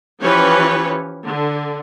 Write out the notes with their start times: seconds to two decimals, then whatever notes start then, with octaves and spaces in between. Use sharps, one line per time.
0.21 E3 F3 C#4 G4 B4 C#5
1.28 D3